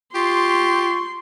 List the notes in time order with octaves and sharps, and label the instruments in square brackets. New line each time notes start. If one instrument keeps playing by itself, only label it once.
[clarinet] F4 [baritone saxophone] G4 [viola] C6 [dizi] C#6